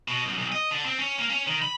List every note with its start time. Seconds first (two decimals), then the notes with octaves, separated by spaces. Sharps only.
0.08 B2
0.25 F#2
0.39 B1
0.52 D#5
0.71 D3
0.85 C4
0.99 C#4
1.18 A#3
1.30 C#4
1.47 D#3
1.62 B5